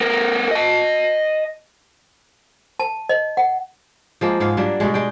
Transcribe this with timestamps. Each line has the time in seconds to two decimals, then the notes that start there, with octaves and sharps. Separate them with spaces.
0.01 B3 A#4
0.51 D#5 A5
2.80 A5
3.09 D#5
3.37 F#5
4.21 F3 G#3 A#3
4.40 G#2 G#3 B3 F5
4.57 F#3 G3 A#3 D4
4.80 B2 G3 G#3
4.94 G#3 G5